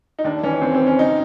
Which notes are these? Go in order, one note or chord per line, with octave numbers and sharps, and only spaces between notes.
D#4
D#2 D4
E3 C#4
D#2 C4
C4
C#3
C#4
F#2 D#4